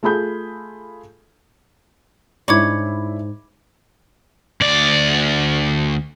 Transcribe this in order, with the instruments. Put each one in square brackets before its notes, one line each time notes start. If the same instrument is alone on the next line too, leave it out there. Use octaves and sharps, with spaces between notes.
[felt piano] A3 F4 G#4 B5 G6
[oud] G#2 C#5 [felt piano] D4 E4 [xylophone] B5 D6 G#6
[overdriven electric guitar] D2 D5